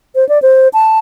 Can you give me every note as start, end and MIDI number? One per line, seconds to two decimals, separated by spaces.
0.15 0.27 72
0.29 0.41 74
0.42 0.68 72
0.73 0.99 81